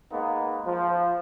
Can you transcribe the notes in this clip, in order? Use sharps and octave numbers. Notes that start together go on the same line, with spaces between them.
G#3 A#3 B3 D#4
F3